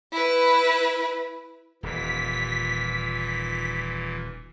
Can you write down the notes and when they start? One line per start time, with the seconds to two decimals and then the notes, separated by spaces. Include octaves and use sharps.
0.12 E4 B4
1.83 D#1 A#2 E3 B6